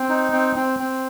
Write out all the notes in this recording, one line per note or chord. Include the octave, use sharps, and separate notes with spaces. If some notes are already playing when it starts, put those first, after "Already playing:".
Already playing: C4
D#4
C4
C4
C4